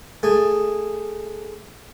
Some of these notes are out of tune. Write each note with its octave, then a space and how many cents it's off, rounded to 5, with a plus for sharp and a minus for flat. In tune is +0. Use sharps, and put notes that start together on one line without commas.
A3 +0 G#4 -10